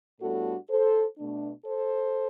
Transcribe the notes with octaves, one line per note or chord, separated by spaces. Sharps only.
A2 G3 B3 D4 F#4 A4
A4 C5
B2 A3 D4
A4 C5